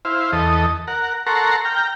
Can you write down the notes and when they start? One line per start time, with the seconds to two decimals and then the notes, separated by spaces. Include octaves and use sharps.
0.05 E4 C5 F5
0.32 E2 A4 D#5
0.87 A#4 F#5
1.27 A4 A#4 F#5 A#5 C6 C#6
1.65 G5 A#5 F6